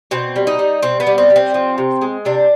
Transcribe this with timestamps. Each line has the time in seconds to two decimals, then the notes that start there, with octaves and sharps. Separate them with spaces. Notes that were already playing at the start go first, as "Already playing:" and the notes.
0.11 B2 C4
0.36 G3
0.47 D#4
0.59 G3
0.83 B2 C4
1.00 B3
1.07 G3
1.18 C4
1.30 G3
1.36 C4
1.54 F3
1.78 C3
2.02 G#3
2.25 C3 D4